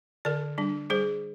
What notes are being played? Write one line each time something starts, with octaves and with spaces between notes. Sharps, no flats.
D3 A#4 D5
G3 D4
G3 G#4 C5